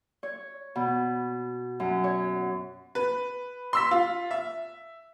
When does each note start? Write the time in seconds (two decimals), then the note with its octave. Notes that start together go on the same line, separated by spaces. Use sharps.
0.23 C#5
0.75 B2
1.80 F#2
2.04 C#5
2.95 B4
3.73 C6 E6 B6
3.91 F4
4.31 E5